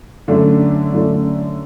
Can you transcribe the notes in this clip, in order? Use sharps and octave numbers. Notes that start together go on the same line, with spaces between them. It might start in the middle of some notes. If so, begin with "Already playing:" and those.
F#2 D3 A3 D4
F#2 D3 A3 D4